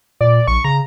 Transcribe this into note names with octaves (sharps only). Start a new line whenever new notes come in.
A#2 D5
A#1 C#6
C#3 A#5